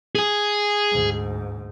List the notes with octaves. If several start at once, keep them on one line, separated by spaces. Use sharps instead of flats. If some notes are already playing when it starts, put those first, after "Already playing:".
G#4 G#5
D2 G#2